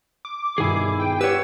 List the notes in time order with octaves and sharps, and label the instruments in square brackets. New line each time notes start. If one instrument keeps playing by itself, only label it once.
[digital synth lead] D6
[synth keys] G2 B2 D#3 [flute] E4 [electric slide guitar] G#4 G#5
[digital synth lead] G5
[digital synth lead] G4 [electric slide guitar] B4 C#5 [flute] F#5 [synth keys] E6